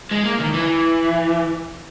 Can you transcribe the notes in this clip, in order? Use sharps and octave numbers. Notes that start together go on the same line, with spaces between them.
G#3
A#3
D#3
E3